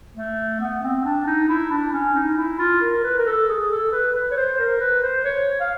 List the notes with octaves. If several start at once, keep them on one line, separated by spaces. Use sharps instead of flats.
A3
B3
C4
D4
D#4
E4
D4
C#4
D#4
E4
F4
A#4
B4
A#4
A4
G#4
A4
B4
B4
C#5
C5
A#4
B4
C5
C#5
F5